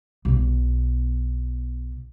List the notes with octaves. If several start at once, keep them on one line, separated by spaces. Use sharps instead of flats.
B1 B2